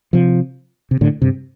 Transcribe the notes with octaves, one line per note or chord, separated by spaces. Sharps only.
C3 F3
C3
A2 D3
G2 C3